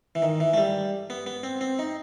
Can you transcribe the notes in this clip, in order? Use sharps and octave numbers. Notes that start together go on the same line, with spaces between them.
E3
D#3
E3
A3
G3
B3
B3
C4
C4
D#4